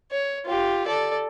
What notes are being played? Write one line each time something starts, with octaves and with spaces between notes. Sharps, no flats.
C#5
F4 G4
A4 D5